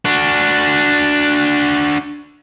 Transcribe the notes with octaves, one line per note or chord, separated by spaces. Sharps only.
D4 F#4